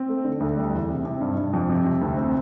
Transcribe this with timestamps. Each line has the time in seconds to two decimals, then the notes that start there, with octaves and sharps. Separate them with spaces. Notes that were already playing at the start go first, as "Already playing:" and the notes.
Already playing: C4
0.09 A3
0.24 D3
0.40 D2
0.57 G3
0.73 E2
0.89 C3
1.05 C3
1.21 G2
1.37 G2
1.53 F2
1.69 C3
1.85 C3
2.01 D2
2.17 C4